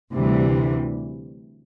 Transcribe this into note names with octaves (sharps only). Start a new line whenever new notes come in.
D2 C3 E3 G3